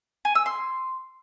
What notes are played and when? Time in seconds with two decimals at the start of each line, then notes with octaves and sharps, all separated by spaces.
0.25 G#5
0.35 E6
0.46 C6